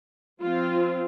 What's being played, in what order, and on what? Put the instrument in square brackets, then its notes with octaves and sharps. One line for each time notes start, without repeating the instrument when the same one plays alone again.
[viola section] F3 C4 F4